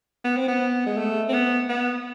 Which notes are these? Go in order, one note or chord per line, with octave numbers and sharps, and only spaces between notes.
B3
C4
B3
G#3
A3
C4
B3
B3